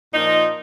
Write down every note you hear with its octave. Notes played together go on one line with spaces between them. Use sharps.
A#2 F3 A#3 D#4